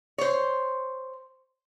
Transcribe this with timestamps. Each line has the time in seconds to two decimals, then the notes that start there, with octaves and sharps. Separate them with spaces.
0.18 C5 C#5